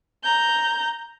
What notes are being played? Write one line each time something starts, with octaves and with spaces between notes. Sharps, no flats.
A#5 G6